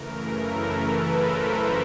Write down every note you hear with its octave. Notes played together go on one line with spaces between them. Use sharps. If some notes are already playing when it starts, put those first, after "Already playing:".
Already playing: F#2 C#3 E3 A3 A#4
A4 B4
A#4 C5